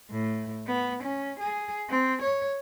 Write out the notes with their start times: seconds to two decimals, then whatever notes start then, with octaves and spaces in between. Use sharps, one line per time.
0.11 A2
0.67 B3
1.03 C#4
1.39 G#4
1.90 C4
2.22 C#5